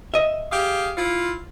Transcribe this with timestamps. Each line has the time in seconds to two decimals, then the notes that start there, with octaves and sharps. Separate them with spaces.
0.14 D#5 E5
0.52 G4 G#4 F5
0.98 E4 F4